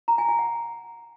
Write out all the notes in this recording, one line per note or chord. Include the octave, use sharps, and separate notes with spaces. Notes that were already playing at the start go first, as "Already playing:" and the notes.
A#5
G#5
G#5
F#5